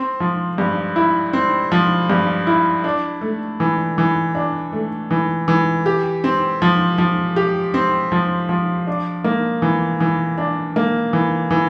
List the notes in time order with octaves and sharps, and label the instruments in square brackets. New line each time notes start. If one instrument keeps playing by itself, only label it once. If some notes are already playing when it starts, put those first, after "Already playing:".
Already playing: [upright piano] C4
F3
G2
E4
C4
F3
G2
E4
D4
A3
E3
E3
D4
A3
E3
E3
G4
C4
F3
F3
G4
C4
F3
F3
D4
A#3
E3
E3
D4
A#3
E3
E3